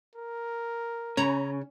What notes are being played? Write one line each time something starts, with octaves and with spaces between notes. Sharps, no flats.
A#4
C#3 C#4 C#5 A#5 B5